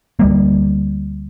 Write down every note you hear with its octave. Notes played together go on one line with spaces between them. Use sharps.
D2 G3 A#3